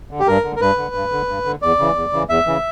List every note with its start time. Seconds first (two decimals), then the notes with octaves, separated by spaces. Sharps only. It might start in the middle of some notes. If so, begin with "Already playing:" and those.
0.11 D3
0.20 G4
0.27 G2 A#4
0.44 D3
0.56 A#4
0.61 G2 B4
0.78 D3
0.95 G2
1.12 D3
1.28 G2
1.45 D3
1.62 E2 D5
1.79 C#3 E3
1.96 E2
2.13 C#3 E3
2.29 E2 E5
2.47 C#3 E3